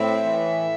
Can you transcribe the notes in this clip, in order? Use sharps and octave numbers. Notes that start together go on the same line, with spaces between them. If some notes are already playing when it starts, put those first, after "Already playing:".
Already playing: A2 C4 E5
E3